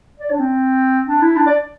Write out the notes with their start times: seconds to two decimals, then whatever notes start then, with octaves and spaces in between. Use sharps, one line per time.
0.20 D5
0.31 D4
0.39 C4
1.07 D4
1.22 E4
1.36 D4
1.47 D5